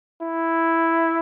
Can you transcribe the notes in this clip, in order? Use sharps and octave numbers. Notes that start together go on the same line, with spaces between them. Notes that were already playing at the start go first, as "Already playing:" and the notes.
E4